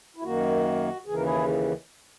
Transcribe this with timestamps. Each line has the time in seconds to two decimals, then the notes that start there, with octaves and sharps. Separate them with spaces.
0.16 E4
0.23 F#2 D#3 A#3 F#4
1.06 D#2 C#3 E3 G#4
1.14 A#4
1.22 E4 G#4